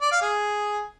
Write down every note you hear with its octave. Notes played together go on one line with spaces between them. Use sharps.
D5
F5
G#4